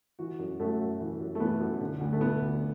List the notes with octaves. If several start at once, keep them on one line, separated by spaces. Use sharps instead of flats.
E3 F#4
F#2
F#2 A3
F#2
E3
F#2
A3
E3 B3
F#2
D3
D2
A3
D3 B3
D2